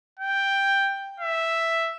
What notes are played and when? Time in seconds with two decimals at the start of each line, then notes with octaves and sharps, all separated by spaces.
0.20 G5
1.20 E5